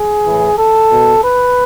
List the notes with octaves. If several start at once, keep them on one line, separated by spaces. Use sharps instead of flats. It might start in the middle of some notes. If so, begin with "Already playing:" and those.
Already playing: G#4
A2 E3
A4
B2
B4